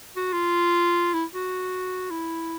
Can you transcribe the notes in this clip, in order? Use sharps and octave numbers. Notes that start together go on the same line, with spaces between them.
F#4
F4
E4
F#4
E4